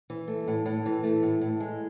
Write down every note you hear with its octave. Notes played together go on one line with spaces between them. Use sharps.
E3
A3
A2
A2
E3
A3
A2
A2
G#3